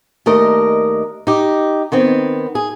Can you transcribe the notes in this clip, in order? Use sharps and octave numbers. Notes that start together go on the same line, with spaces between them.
D#2 A3 D4 A#4 D#5
D#4 G4
D#3 B3 C4
G#4